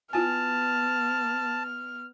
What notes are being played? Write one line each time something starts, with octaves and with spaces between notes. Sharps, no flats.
B3 E4 F4 G#5 A5 F6